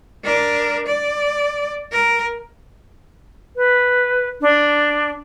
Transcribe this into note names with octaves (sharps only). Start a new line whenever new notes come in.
D4 A#4
D5
A#4
B4
D4